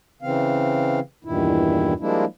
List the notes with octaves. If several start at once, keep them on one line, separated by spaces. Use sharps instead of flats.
C#3 E3 C4 F5
E2 G2 A#2 D#3 E4
F3 G3 G#3 A#3 D4 E4